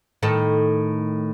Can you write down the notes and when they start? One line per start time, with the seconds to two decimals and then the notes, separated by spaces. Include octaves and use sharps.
0.23 A2 D#3 A4